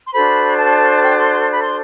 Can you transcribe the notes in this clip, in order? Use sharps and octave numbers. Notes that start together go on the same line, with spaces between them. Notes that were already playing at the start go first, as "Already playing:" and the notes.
C6
D4 F#4 A4 C5 B5
A5
G5
C6
C6
B5
C6